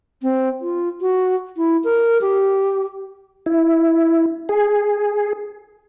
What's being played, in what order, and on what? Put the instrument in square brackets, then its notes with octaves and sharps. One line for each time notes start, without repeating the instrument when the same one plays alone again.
[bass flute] C4
F4
F#4
E4
A#4
G4
[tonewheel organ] E4
G#4